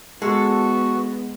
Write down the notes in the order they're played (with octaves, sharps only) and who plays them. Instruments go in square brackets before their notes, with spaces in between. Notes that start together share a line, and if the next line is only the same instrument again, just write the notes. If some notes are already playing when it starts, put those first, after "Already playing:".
[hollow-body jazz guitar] G#3 [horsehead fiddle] B3 [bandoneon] F#4 [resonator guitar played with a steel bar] A4